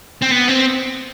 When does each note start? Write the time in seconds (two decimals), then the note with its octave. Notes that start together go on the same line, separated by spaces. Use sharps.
0.22 C4
0.32 B3
0.49 C4